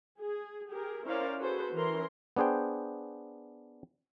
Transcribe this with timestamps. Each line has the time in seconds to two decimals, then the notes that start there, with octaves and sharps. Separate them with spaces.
0.19 G#4
0.69 G4 G#4 A#4
1.05 C#4 E4 A#4 C5 D5 F5
1.38 F#4 G#4 A4 B4 C5
1.74 E3 C#4 A#4 C6
2.36 B3 D4 G#4 C5 G5